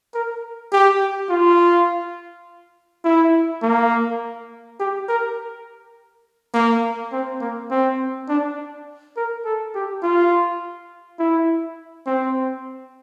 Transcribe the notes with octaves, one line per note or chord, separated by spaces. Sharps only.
A#4
G4
F4
E4
A#3
G4
A#4
A#3
C4
A#3
C4
D4
A#4
A4
G4
F4
E4
C4